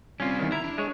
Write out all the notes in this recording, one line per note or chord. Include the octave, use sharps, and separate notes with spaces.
G3 C4 C#4 F4
E2 D#3
E4 A#5
D4
G#3 C#5